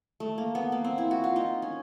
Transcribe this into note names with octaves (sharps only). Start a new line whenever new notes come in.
A3
A#3
B3
A#3
C4
E4
F#4
F4
D#4
C#4